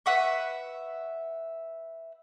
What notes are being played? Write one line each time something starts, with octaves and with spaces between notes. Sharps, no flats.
B4 E5 F#5 C#6